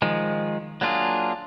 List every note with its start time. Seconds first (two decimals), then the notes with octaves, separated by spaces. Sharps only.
0.02 D#3 F3 G#3
0.81 F#3 A#3 D4 F4 G#4